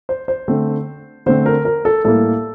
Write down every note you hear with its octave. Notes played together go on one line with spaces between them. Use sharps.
C5
C5
D3 A3 C4
D3 A3 C4 C5
A#4
A#4
A4
A2 G3 A#3 A4